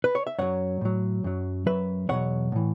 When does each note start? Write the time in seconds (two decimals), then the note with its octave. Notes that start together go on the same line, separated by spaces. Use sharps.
0.04 B4
0.15 C#5
0.27 E5
0.38 F#2 F#3 C#5 F#5
0.81 A2 F#3
1.24 F#2 F#3
1.66 F#2 F#3 B4 E5
2.09 E2 B2 F#3 C#5 F#5
2.52 A2 E3